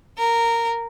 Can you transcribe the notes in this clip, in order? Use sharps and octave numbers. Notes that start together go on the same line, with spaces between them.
A#4